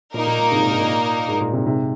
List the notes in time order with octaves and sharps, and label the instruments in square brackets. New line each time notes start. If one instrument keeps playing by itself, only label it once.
[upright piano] A#2 [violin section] A#3 D#4 A#4
[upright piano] A#2
A#2
G#2 C3
A#2
G#2
A#2
G#2
A#2
G#2 C3
G#2 C3